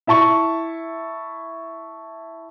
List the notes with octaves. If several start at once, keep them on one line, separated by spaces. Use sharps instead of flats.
E4 E5 A5 C#6